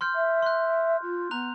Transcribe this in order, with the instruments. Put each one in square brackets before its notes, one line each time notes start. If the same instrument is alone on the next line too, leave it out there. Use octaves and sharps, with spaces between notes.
[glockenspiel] C6 F6 G6
[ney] E5
[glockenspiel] C6 F#6
[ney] F4
[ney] B3 [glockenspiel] A#5 F#6 F7